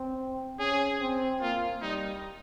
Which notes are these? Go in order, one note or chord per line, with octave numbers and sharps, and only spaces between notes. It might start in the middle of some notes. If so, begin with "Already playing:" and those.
Already playing: C4
C#4 G#4
C4
A#3 F4
G3 D#4